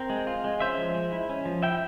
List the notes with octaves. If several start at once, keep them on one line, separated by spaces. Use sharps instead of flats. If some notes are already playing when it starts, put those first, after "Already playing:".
Already playing: C4 A#4
G#3
F4
G#3
C#4 C5 E5
F3
G#3
E4
C#4
F3
E4 E5 G5